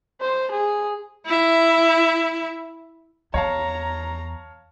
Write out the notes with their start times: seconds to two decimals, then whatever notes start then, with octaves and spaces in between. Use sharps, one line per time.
0.21 C5
0.51 G#4
1.26 E4 E5
3.34 E2 C#5 F5 A5 A#5